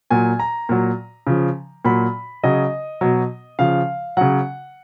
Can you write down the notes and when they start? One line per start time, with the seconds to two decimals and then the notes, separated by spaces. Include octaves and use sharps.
0.10 A#2 F#3 G#5
0.40 A#5
0.69 A#2 F#3
1.27 C#3 F3
1.85 A#2 F#3 B5
2.43 C#3 F#3 D#5
3.01 B2 F#3
3.59 C#3 F3 F5
4.17 C#3 F#3 F#5